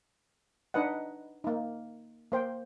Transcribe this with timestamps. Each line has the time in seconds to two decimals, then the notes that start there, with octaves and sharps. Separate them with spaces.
0.74 D4 D#4 B4 D#5 F#5
1.44 A#3 D#4
2.32 A#3 C5 G5